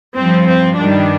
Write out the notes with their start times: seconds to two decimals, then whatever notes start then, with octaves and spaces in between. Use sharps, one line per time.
0.18 G2 F3 C4
0.48 C4
0.79 G2 D#3 G3 D4